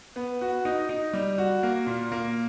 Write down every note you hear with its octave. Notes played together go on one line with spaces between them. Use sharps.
B3
F#4
D#4
D#4
G3
F#4
A#3
A#2
A#3